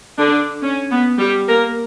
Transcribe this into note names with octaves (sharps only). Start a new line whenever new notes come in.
D3 D4
C#4
B3
G3 G4
A#3 A#4